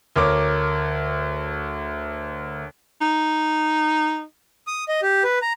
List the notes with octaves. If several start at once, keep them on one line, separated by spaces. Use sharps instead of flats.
D2 A#4 C#5 D6
D#4
D#6
D#5
G4
B4
A#5